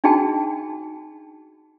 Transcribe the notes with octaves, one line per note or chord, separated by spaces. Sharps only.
D4 D#4 F#4 G#4 G5 A5